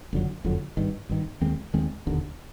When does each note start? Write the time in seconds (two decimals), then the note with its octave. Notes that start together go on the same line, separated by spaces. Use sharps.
0.13 F#1 F2 D3 F#3
0.44 F#1 F2 D3 F#3
0.77 G#1 G2 D#3
1.09 G#1 G2 D#3
1.41 D#2 D#3 G#3 C4
1.74 D#2 D#3 G#3 C4
2.06 E1 D#2 D3